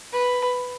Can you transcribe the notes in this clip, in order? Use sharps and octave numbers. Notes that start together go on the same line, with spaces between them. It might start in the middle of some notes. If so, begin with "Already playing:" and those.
B4